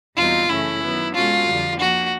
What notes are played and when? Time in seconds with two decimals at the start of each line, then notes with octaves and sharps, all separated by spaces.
0.16 E2 B2 G3 C4 D#4 F4
0.49 F#2 C#3 E3 A3 C#4 E4
0.82 D#3 F#3 B3
1.14 B2 G#3 C#4 F4 F#4 A4
1.47 F2 D3 G3
1.79 F3 A#3 D4 F#4